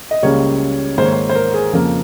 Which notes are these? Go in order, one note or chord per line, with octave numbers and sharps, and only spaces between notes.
D#5
C#2 C#3 G3 A#3 C#4 C#5
G#2 D#3 A#3 C5
C#5
C5
C5
A#4
G#4
F2 C#3 F3 A#3